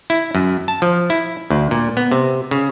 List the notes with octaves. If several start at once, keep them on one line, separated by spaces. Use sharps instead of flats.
E4
F#2
A5
F3
E4
D2
A#2
B3
C3
C#3